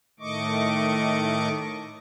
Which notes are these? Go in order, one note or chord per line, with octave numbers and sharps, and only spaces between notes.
A2 D#3 A3 D#5 C#6 D6